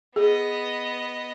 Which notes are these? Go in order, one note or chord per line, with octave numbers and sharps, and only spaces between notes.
B3 G#4 D#5